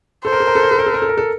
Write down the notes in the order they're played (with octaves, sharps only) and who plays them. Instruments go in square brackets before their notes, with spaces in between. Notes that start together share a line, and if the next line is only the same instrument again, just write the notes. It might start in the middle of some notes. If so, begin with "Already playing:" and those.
[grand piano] A4 [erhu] C5
[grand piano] A#4
A4
A#4
A4
A#4
A4
A#4
A4
A#4
A4
A#4
A4